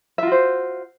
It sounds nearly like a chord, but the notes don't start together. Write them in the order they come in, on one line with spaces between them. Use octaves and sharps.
E5 F4 F#4 C5